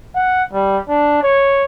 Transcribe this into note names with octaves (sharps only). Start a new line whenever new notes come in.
F#5
G3
D4
C#5